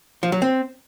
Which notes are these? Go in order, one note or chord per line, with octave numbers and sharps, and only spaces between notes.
F3
F#3
C4